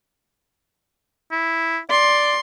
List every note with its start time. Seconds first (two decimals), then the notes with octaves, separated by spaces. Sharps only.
1.32 E4
1.90 D5 C6